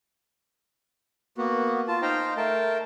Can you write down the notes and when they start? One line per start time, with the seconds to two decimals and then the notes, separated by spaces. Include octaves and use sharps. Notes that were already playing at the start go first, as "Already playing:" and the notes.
1.38 A#3 B3 F#4
1.88 F4 A5
2.02 D#4 C5 F5 G5 A#5
2.37 A3 A#4 G5 A5